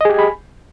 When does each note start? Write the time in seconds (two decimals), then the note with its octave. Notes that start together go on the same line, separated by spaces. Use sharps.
0.01 D#5
0.05 G#4
0.10 G4
0.14 G#5
0.19 B5